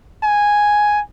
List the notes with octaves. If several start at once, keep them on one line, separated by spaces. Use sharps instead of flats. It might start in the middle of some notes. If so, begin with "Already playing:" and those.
G#5